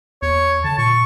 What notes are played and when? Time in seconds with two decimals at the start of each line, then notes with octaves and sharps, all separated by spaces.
0.22 E2 C#5
0.64 D3 A5
0.78 A#2 C#6